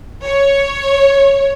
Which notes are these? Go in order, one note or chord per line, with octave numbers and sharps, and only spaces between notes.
C#5